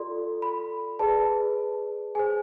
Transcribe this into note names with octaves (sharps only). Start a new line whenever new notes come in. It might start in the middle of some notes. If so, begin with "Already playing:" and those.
Already playing: F4 A4 D5 C6
B5
G#4 B4 D5 A5
G#4 C5 G#5